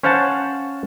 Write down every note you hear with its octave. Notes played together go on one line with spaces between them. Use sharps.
C#4 C5 F5 F#5 A5